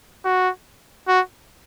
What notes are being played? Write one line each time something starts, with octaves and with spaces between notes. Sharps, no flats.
F#4
F#4